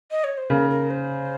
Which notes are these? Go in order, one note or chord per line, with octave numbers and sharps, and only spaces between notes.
D#5
C#5
C5
C#3 A#4
A#4
C5